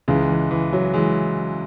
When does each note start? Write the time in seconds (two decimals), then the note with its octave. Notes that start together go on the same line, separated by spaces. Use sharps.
0.08 C#2 C#3 E3 G#3
0.29 E3
0.51 E3
0.73 F#3
0.94 E3 G#3